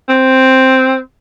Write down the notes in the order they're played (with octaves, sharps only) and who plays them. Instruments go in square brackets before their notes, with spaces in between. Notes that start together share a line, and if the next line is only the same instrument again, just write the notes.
[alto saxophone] C4